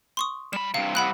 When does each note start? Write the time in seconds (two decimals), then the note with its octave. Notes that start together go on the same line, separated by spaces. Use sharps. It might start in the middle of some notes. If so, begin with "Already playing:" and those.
0.17 C6 C#6 D#6
0.53 G3 B5 E7
0.74 G2 C3 F5
0.95 C2 C3 F#5 B5 F#6